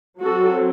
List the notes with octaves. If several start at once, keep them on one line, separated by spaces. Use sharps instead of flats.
F#3 C4 F#4 A4